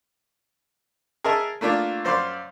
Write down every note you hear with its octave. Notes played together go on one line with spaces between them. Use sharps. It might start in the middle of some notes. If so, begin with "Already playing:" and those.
G#4 A#4 D#5 E5 A5
A3 A#3 D4 F4
F#2 C5 D5 F5 C6